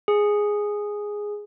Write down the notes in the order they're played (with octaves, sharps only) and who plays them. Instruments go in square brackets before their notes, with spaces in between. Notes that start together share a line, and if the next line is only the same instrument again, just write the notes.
[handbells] G#4